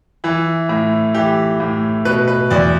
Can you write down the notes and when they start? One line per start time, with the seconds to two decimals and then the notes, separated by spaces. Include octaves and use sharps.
0.24 E3 E4
0.69 A2
1.15 E3 G4
1.60 A2
2.05 B2 B4
2.28 B4
2.50 E2 D5